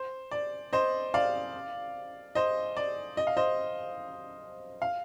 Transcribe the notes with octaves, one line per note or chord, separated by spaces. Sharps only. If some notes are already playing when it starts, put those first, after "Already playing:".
Already playing: C5
D5
C5 D#5
D5 F5
C5 D#5
D5
D#5
F5
C5 D#5
F5